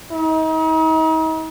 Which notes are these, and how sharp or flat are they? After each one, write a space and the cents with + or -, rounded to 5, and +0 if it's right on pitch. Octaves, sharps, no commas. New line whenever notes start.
D#4 +40